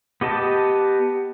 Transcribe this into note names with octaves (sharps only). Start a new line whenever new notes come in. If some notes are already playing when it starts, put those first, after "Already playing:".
B3 G4 D#5 A5